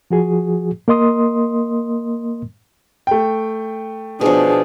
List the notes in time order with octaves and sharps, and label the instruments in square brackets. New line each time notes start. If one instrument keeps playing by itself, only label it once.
[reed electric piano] F3 F#4 G#4
A#3 A#4 D#5 C6 D#6
[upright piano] A3 G5
[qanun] B2 F3 [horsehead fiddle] D4 G#4